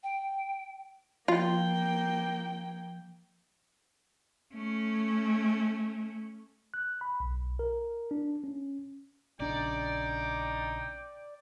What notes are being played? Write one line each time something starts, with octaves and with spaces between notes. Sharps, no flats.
G5
F3 A#3 F4 G5
A3 C#4
F#6
B5
B1
A#4
D4
C#4
A#1 C#3 D4 D#4 D5 G5